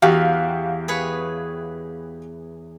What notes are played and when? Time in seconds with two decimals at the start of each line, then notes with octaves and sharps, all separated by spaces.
0.02 E2 F#4 G4 F5
0.88 G#4 B4 C#5